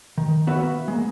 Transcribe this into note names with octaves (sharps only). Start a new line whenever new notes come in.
D#3
B3 F#4 B4 E5 F5
G#3 A#3